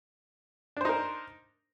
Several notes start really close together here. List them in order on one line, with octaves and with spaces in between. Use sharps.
D4 C5 D#4 A#4